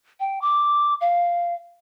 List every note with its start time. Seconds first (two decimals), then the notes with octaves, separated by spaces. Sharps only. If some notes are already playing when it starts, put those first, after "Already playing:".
0.20 G5
0.41 D6
1.01 F5